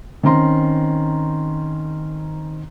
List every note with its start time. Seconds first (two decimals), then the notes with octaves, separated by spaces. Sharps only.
0.23 D#3 C4 C#4 A#5 C6